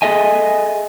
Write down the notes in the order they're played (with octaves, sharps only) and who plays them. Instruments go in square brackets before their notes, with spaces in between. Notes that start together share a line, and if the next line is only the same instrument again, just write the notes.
[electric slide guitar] G#4 A4 D#5 E5 G#5